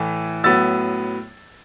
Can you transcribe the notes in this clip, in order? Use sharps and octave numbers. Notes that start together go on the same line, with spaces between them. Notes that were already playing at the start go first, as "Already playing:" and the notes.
Already playing: A2 E3 A3
A2 F#3 B3 E6 A6